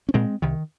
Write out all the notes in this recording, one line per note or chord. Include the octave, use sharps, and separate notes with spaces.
C#4
A#2 G#3 C4
C2 D#3